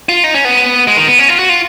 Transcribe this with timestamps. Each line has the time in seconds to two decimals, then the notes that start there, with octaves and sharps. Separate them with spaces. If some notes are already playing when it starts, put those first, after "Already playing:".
0.09 F4
0.24 D#4
0.34 C#4
0.45 B3
0.88 G#3
0.97 D#3
1.08 B3
1.19 C#4
1.29 F4
1.39 F#4
1.49 F4